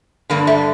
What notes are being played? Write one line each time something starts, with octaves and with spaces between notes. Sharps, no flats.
G2 D3 A#3
A3